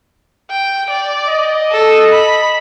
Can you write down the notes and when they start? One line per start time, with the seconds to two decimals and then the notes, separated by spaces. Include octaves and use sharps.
0.50 G5
0.90 D5
1.28 D#5
1.71 A4
2.12 B5